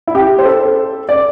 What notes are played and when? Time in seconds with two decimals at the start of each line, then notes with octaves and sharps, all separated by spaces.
0.07 E4
0.15 G4
0.39 C5
0.45 A4
1.09 D5